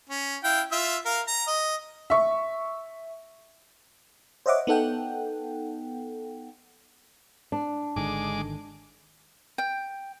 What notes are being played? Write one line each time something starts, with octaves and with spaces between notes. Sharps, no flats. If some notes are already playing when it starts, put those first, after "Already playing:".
C#4
E4 F5 G5
F4 E5 E6
A#4 F5
A#5
D#5
E5 C#6
C5 C#5 D#5 E5 F#5 D6
B3 D#4 A4 F#5 G5
D4
G#1 D3 D#3 G#3 D6
G5